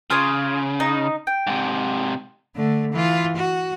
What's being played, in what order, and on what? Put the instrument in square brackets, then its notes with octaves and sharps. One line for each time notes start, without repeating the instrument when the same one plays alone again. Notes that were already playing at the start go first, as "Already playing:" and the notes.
[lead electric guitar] C#3 [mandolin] F4 G#4 C#5
[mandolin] D#4
G5
[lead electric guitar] G#2 C3
[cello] D3 A3
E3 F4
F#4